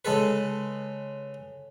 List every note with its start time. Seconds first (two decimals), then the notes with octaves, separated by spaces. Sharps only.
0.05 C#3 G#3 A4 B4